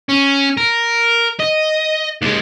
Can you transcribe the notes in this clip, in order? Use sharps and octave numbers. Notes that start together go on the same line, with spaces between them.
C#4
A#4
D#5
D#2 G#3